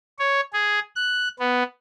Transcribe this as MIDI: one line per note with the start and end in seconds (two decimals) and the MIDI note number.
0.19 0.41 73
0.53 0.80 68
0.96 1.28 90
1.39 1.63 59